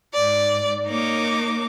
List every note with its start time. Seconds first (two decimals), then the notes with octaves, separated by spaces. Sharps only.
0.14 G#2 D5
0.86 A#3 D#4 C#5 D6